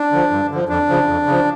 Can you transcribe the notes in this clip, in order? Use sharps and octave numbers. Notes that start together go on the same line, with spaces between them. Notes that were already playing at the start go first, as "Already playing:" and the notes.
Already playing: D4
D3 F3
G2
D3 F3
F2 D4
C#3 F3
F2
C#3 F3